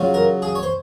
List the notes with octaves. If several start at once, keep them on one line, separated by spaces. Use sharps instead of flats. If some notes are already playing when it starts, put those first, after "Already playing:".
Already playing: C#3 F#3 C#4 F4
A#4
G#4
C#5
C5